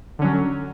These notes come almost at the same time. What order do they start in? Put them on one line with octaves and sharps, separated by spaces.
D3 C#4 F#3